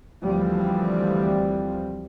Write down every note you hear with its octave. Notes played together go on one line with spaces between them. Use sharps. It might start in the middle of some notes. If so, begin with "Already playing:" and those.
D2 E3 F3 G3 C4